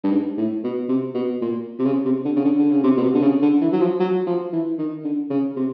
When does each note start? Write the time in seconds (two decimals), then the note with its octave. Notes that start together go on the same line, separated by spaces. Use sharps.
0.04 G2
0.12 G#2
0.37 A2
0.64 B2
0.89 C3
1.14 B2
1.41 A#2
1.79 C3
1.86 C#3
2.05 C3
2.25 D3
2.36 C#3
2.45 D3
2.59 D3
2.72 C#3
2.84 C3
2.97 B2
3.03 C3
3.14 D3
3.23 C#3
3.42 D3
3.61 E3
3.73 F#3
3.81 F3
4.00 F#3
4.27 F3
4.53 E3
4.78 D#3
5.04 D3
5.30 C#3
5.57 C3